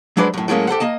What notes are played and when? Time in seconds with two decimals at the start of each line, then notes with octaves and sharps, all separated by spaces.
0.17 F#3 G#3 D4 B4 C5 D5
0.34 F#2 A2
0.48 A2 F#3 G#3 A#3 C#4
0.68 G4 A4 C5 F#5
0.80 A#3 D#5 A5